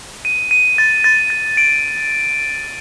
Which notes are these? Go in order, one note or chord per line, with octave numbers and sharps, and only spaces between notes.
D#7
D#7
A6
A6
A6
D7